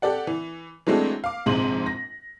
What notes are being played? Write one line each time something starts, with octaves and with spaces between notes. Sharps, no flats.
G4 A4 D5 F#5
E3
E3 F#3 G#3 A3 C4 D4
F5 D6
A#1 G#2 C3 G#3 C6 F#7
A#6